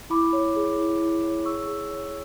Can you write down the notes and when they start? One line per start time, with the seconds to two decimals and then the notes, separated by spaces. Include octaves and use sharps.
0.10 E4 B5 D6
0.33 C#5
0.56 G#4
0.78 E4
1.00 E4
1.23 C#5
1.45 G#4 C#6 E6
1.67 G#4
1.91 C#5